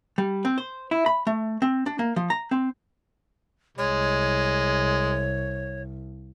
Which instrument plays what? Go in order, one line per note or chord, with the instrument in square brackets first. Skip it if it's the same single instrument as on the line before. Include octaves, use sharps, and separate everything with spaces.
[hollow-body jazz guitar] G3
C4
C5
E4
B5
A3
C4
D4
A#3
F3
A#5
C4
[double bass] C2 [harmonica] G#3 [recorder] C#5